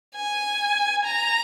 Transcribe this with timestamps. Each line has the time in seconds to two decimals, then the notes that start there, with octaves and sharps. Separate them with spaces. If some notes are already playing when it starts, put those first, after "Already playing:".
0.16 G#5
1.04 A#5